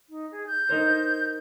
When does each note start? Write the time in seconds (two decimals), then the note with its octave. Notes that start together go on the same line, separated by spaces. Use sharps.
0.10 D#4
0.31 G#4
0.47 G6
0.69 D#4 A#4 C5